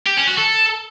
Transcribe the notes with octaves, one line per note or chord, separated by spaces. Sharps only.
G4
C#4
F#4
A4